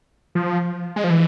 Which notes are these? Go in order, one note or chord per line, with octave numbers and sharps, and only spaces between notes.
F3
G#3
F3
E3